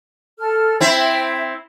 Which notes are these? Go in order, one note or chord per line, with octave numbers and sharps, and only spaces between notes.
A4 F6
C4 E4 C5 E5 G5